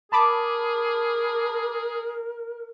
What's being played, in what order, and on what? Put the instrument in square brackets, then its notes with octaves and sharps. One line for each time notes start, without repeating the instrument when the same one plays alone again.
[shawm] G#4 [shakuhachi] A#4 [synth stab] A5 B5 D6